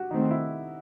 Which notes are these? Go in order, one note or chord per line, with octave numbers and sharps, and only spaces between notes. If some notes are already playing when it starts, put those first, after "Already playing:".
Already playing: F#4 G4
D#3 A3 C4 D#4
E4